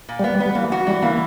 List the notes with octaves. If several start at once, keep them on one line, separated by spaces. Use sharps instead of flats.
A#2
G3
A#3 B3
G3
B3
G3
E3 A#3
F#4
E3 G3
E3 A#3